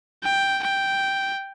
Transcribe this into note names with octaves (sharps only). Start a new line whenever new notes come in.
G5
G5